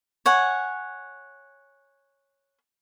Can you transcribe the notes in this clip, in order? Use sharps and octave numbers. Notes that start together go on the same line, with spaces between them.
C#5 F#5 G#5